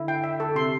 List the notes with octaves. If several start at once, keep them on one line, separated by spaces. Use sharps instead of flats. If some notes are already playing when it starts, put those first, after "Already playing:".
Already playing: D3 E4
G5
E5
A4
C3 C6